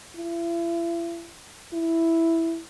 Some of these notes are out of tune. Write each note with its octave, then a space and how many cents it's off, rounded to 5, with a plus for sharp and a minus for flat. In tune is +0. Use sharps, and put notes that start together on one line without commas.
E4 +40
E4 +0